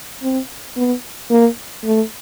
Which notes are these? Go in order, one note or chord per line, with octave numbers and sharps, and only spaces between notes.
C4
B3
A#3
A3